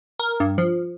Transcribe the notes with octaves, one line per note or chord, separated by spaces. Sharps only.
A#4
G2
F3